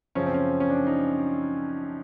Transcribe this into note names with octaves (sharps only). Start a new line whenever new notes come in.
F#2 C#3 F3 C#4
C4
C#4
C#4
D4
D#4